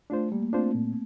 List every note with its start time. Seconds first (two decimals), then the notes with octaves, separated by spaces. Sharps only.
0.10 A3 D4 F4 C5
0.32 G3 A#3
0.43 A#3
0.53 A3 C4 D4 F4 C5
0.64 A#3
0.75 A#2